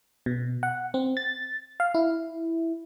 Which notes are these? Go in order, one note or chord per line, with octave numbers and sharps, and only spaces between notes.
B2
F#5
C4
A6
F5
E4